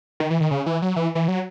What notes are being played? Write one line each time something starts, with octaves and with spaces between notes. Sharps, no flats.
D#3
E3
D#3
C#3
E3
F#3
E3
E3
F#3